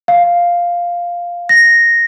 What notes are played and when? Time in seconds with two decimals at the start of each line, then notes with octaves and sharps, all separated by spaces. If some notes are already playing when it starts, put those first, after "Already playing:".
0.08 F5
1.49 A#6